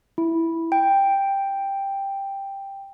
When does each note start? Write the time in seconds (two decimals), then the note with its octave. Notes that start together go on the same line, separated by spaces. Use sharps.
0.18 E4
0.72 G5